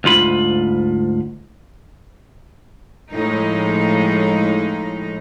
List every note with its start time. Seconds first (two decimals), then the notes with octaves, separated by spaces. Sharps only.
0.04 D2 G#2 F4 B5
3.12 A2 F3 G#3 D#4